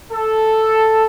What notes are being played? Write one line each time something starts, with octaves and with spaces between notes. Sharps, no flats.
A4